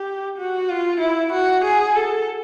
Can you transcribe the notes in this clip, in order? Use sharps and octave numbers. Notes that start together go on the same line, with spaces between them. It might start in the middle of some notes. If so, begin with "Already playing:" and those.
Already playing: G4
F#4
F4
E4
F#4
G#4
A4